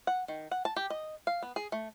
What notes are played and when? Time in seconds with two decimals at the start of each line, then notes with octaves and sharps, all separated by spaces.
0.07 F#5
0.28 D#3
0.51 F#5
0.65 A5
0.76 G4
0.90 D#5
1.27 F5
1.42 B3
1.56 G#4
1.72 A3